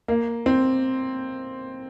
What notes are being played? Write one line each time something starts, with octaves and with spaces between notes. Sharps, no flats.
A#3
C4